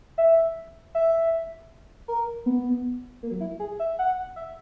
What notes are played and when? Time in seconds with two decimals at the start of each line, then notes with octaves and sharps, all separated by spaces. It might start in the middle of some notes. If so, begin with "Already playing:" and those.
0.18 E5
0.95 E5
2.08 A#4
2.46 B3
3.23 A#3
3.31 F#3
3.41 E4
3.60 G#4
3.79 E5
3.99 F#5
4.36 E5